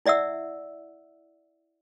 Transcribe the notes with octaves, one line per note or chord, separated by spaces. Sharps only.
E4 D5 E5 F#5 E6